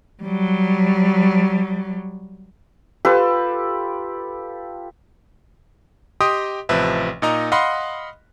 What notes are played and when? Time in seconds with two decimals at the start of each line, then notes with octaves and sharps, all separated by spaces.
0.23 F#3 G3
3.05 F4 G4 A4 B4
6.20 G4 D#5 G5 C6 D#6
6.69 A1 C3 F3 B4 E5
7.22 A#2 D#4 D#5 A#5
7.52 D#5 F5 F#5 B5 C6